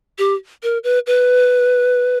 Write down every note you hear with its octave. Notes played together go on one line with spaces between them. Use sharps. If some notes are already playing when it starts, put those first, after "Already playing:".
G4
A#4
B4
B4